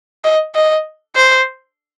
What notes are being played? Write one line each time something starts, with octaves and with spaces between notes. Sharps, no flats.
D#5
D#5
C5